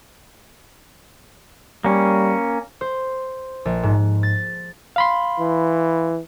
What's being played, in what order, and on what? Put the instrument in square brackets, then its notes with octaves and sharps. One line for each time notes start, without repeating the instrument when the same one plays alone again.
[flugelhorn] G3 [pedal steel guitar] A#3 C#4
[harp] C5
A#1
G#2
A6
[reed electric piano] F5 B5 C6
[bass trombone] E3